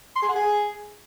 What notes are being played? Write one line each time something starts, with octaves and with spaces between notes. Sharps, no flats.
C6
G#4
F#5
G#4